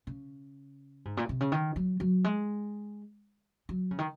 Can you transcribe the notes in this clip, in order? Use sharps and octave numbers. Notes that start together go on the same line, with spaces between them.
C#3
G#2
A#2
C3
C#3
D#3
F#3
F#3
G#3
F#3
C#3
D#3